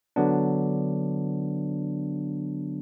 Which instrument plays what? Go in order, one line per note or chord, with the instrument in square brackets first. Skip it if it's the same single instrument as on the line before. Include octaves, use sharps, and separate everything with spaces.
[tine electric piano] D3 F#3 B3 D4